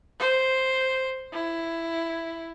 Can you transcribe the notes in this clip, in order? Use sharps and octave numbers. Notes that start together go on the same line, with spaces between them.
C5
E4